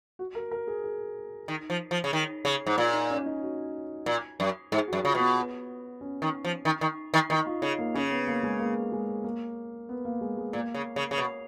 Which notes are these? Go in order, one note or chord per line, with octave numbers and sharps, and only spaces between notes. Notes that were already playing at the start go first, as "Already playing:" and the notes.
F#4
A#4
A#4
G#4
G#4
D#3
F3
F3
C#3
D#3
C#3
G#2
A#2 F4
D#4
C#4
D#4
F#4
A#2
F#2
G#2 G#4
F#4
F#2
C#3 F4
B2
B3
C#4
D#3
F3
D#3
D#3
D#3
D#3 D#4
F4
C#3 D#4
A#3
C#3 C#4
B3
A#3
G#3
A#3
G#3
A#3
B3
A#3
G#3
G#3
A#2 A#3
C#3
C#3
C#3
B2